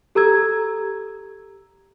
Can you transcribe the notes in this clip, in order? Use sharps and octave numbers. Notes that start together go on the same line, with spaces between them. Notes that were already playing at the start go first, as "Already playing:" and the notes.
G4 A4 A#5 E6 G#6